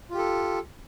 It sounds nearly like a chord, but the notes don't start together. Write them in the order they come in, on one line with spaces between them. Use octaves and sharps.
F4 G4 A4